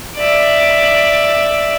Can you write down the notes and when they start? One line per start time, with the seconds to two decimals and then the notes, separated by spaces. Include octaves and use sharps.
0.17 D5 E5